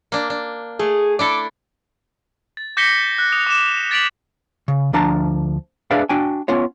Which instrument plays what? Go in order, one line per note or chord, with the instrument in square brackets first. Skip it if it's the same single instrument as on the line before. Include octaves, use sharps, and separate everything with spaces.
[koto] A#3 D4
D4
[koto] A3 [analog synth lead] G#4
[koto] D4 E4 A4 [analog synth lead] D6
[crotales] A6
D6 G6 A#6 B6 C#7 G7
F#6
D#6 C#7 F7
D6 E7
A6 B6 D7 F7 F#7
[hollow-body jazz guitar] C#3
D2 F3 D4 A5 A#5
D4 G#4 B4 D5 E5 F5
D4 F#4 G5 G#5
B3 C#4 F4 C#5